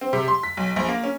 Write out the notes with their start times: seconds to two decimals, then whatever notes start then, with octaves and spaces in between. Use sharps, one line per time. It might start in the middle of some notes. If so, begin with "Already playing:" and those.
0.01 C4
0.13 C3
0.28 C6
0.43 B6
0.57 B1
0.76 A#1
0.89 A#3
1.04 C#4